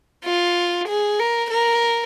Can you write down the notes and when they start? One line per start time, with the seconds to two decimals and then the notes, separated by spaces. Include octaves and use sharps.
0.24 F4
0.88 G#4
1.20 A#4
1.50 A#4